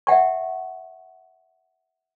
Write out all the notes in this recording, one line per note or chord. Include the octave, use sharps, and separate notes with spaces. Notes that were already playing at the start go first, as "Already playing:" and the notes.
E5 F#5 G5 C#6